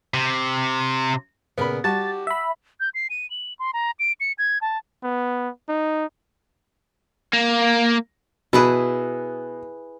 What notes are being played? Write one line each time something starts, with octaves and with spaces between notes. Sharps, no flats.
C3
A#2 C#3 B3 A#4 B5
G3 F#4 G4 A5 A6
E5 B5
G6
C7
D#7
F#7
C6
A#5
D7
C#7
G#6
A5
B3
D#4
A#3
B2 E4 G#4 B4